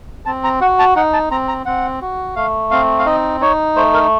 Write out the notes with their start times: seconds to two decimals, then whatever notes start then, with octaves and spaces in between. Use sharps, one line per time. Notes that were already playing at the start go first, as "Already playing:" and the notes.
0.26 C4 A5
0.44 A#5
0.61 F#4 F#5
0.79 A5
0.96 D#4 F#5
1.13 A5
1.31 C4 A#5
1.48 A#5
1.66 C4 F#5
2.01 F#4
2.36 A3 F5
2.71 C4 F5
2.99 F5
3.06 D#4 D#5
3.41 D#4 C#5
3.76 A3 C5
3.94 A#4